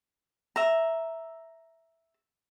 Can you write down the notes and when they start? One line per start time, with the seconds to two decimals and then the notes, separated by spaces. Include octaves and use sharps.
0.56 E5 A#5